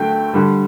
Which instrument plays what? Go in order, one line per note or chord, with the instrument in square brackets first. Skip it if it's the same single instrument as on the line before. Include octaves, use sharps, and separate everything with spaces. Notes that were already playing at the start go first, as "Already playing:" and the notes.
Already playing: [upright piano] D3 F#3 A3 G5
D3 G3